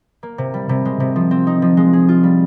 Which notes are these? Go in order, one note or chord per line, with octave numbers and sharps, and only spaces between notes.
A#3
C3
G3
C3
G#3
C3
F3
C4
D#4
F3
G#3
G#4
F4
G3